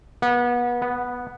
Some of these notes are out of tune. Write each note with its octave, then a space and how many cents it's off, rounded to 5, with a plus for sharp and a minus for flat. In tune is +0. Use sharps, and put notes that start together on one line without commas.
B3 -30
B3 -5